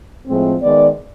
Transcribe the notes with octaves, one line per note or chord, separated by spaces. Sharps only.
A2 F3 G#3 C4
D#3 G#3 B3 D5